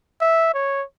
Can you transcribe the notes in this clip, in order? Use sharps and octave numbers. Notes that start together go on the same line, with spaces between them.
E5
C#5